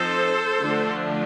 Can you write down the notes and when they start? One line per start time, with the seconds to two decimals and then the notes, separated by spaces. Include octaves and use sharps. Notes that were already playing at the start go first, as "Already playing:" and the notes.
Already playing: F3 C4 D#4 A4 C5
0.60 D3 F3 A3 D4